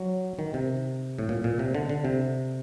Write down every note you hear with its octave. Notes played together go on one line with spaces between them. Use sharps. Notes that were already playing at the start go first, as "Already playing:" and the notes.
Already playing: F#3
D#3
C3
A2
A#2
A#2
C3
D3
D3
C3